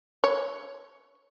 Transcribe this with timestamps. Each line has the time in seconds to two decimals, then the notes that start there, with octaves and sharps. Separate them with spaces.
0.24 C#5